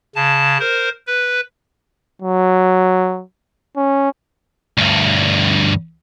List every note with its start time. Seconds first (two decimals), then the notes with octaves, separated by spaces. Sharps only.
0.15 C#3 A5
0.60 A#4 C5
1.07 B4
2.22 F#3
3.77 C#4
4.78 D2 G2